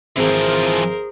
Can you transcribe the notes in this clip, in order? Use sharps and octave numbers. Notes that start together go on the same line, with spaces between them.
G#1 E3 F3 C4 G#4 A#4 C5